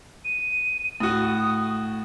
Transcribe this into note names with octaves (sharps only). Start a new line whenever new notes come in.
D#7
A2 F#4 D#6